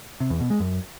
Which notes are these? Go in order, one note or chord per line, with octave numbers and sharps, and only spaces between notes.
C3
E2
B2
G#3
F#2